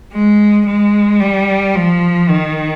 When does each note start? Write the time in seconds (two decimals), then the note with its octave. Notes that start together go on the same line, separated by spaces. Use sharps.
0.13 G#3
0.66 G#3
1.20 G3
1.75 F3
2.29 D#3